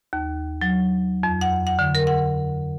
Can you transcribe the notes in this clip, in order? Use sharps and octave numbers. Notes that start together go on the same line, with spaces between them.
D#2
F#3
F2
F#5
F#5
D3
A#4
F#5